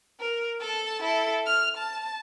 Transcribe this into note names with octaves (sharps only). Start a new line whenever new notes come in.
A#4
A4 A5
E4 A4
F6
A5